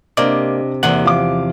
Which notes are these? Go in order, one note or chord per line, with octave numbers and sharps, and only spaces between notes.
C3 A#3 D4 D5 D#5
E2 C3 A#3 F#5
F3 F5 D6